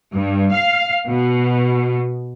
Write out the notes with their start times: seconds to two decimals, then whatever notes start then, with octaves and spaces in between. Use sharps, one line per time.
0.13 G2
0.51 F5
1.08 B2